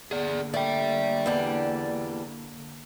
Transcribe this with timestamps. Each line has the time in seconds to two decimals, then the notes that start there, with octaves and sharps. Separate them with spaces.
0.11 D3 A#3 G#4 D5
0.54 A3 D5 G5
1.26 E2 G3 D4